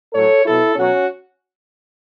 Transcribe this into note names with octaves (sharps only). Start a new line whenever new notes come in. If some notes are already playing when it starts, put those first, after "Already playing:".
A2 F#3 A4 C#5
B2 F#3 E4 A4
B2 F#3 C#4 F#4